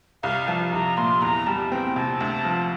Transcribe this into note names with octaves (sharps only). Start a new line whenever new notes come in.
C2 F5
F3 A5
C2 A#5
A#2 C6
E2 A#5
G3 A5
C4 G5
C3 A5
D2
F3